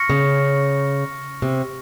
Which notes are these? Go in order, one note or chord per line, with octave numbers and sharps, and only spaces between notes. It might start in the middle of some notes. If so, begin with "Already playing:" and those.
Already playing: C#6 F6 A#6 C#7
C#3
C3